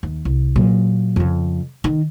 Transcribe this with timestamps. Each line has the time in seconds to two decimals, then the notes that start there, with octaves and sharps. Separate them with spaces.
0.03 D#2
0.25 C2
0.56 A#2 F#3
1.16 F2 C#3
1.84 D#3